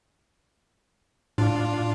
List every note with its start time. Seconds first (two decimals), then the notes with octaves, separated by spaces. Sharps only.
1.38 A2 D4 F4